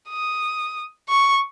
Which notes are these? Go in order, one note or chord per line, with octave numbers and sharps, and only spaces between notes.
D#6
C#6